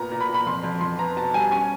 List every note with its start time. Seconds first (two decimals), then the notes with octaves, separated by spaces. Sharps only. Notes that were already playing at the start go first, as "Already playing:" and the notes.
Already playing: A#2 B3 A#5
0.11 A#2
0.20 B5
0.28 A#2
0.34 B5
0.46 F2 C6
0.64 F2
0.81 F2 C6
0.99 B3 A#5
1.17 B2 A5
1.34 G3 G#5
1.51 C#4 G#5